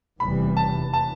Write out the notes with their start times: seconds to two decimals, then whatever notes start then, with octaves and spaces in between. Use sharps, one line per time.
0.19 F1 E2 C3 E3 G3 B5
0.57 A5
0.93 A5